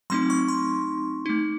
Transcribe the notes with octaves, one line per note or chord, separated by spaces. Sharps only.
F#3 A3 C4 D#4 C6
C#6
C6
A3 D#4